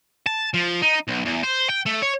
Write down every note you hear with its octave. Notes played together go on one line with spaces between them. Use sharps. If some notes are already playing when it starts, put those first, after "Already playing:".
A5
F3
D#4
B1
E2
C5
G5
A3
C#5